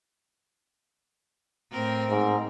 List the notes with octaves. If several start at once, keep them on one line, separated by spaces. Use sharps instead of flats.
A2 C4 A#4
G#2